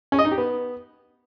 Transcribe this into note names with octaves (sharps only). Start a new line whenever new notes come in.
C#4
D#5
D#4
G4
B3